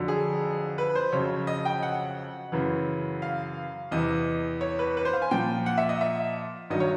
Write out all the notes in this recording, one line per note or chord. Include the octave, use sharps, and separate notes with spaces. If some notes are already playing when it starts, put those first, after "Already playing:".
Already playing: F2 D3 F#3
G#4
B4
C5
F2 C#3 F#3 C#5
D#5
G5
F#5
F#2 C#3 E3
F5
E2 C3 E3 D#5
C#5
B4
B4
C5
F5
G#5
A#2 F3 G5
F#5
E5
D#5
E5
G2 D#3 F#3 D#5
C#5